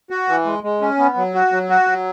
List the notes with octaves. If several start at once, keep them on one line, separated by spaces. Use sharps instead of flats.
F#4
E3
G#3
G#3
C#4
B3
F#3
F#4
F#3
F#4
F#3